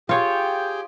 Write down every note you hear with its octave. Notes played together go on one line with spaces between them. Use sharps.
F4 G4 G#4 C#5 G5